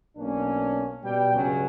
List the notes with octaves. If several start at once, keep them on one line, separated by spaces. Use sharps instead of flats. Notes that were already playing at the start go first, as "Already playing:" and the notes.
B1 A#3 C#4 D4
B2 G3 G5
C#2 G2 F#3 C#4